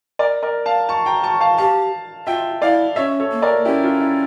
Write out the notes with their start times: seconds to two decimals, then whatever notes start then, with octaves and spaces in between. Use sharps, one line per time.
0.19 A#4 D5
0.43 A#4 D5
0.66 F5 A5
0.89 A5 C#6
1.06 G5 A#5
1.23 A5 C#6
1.40 F5 A5
1.58 G4 F5 A5
2.27 F4 E5 G5
2.61 E4 D5 F5
2.96 C#4 C#5 E5
3.20 A4 C#5
3.31 A#3
3.42 A#4 D5
3.65 C#4 E4 G4
3.83 F4
4.00 E4